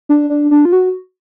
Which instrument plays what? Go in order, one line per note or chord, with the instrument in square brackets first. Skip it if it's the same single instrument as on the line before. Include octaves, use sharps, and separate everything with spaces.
[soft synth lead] D4
D4
D4
F4
F#4